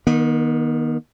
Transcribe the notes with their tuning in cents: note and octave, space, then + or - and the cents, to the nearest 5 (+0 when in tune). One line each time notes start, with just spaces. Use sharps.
D#3 +0 B3 -45